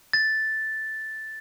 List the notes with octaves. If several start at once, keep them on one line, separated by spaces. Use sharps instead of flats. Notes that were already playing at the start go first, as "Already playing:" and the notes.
A6